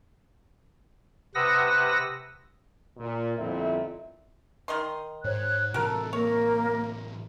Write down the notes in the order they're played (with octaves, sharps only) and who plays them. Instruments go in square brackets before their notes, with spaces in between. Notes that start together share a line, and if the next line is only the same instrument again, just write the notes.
[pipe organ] C3 B4 F#5 D#6 E6 A#6
[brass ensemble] A#2
G1 F2 A#2 C4 E4 E5
[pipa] D#3 D#5 C6
[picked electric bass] G#2 [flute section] C5 C#5 F#6
[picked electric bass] A2 C3 E3 [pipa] F#4 A#4 [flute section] A4
[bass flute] A#3 [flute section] A#4 [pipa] C#5